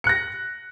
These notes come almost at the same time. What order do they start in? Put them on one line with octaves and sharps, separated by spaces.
C#7 F#6 A#6